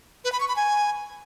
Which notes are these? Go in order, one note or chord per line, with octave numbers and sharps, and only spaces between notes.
B4
B5
C#6
B5
G#5